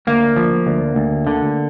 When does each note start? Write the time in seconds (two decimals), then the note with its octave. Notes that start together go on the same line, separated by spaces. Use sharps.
0.07 D2 A#3
0.37 F3
0.66 D2
0.96 D2
1.27 D3